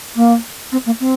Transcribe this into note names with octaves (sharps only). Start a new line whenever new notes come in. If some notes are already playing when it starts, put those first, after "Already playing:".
A#3
C4
A#3
C4